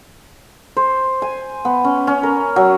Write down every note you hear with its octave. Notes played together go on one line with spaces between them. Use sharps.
C5
G#5
B3
C#4
C#4
A#4
F#3